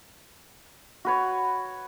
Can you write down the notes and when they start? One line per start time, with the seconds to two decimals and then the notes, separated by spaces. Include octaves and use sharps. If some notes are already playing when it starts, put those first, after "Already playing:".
1.05 F#4 B4 C#5